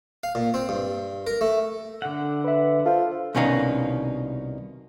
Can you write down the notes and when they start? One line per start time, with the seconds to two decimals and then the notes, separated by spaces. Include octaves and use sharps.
0.23 F5
0.35 A#2
0.54 C4
0.69 G2
1.27 A#4
1.41 A3
2.02 D3 F#5
2.44 B4 E5
2.86 F4 A4 C5
3.35 C2 B2 D#3 C#4 D#4 F5